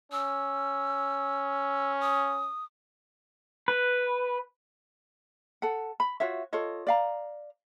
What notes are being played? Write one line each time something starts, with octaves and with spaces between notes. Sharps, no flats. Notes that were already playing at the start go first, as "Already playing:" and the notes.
C#4 E6
D#6
B4
A4 F#5
B5
F4 F#4 C#5 E5
F4 A4 C#5 D#5
D5 F5 A#5